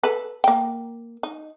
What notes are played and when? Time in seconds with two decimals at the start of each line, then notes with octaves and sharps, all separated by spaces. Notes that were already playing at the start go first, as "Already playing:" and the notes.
0.03 A4 B4
0.44 A#3 G5
1.23 D#4